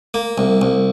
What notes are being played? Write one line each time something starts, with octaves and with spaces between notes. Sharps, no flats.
A#3
C2
C2